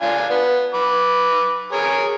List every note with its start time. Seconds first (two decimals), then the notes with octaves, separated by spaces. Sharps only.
0.02 D4 F4 G#5
0.30 B3
0.74 B4 D6
1.73 G#4 A#4 C#5